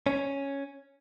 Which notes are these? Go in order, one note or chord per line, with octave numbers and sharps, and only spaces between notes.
C#4